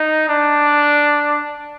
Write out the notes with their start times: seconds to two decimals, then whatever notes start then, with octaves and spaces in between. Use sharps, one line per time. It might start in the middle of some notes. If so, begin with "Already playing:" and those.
Already playing: D#4
0.29 D4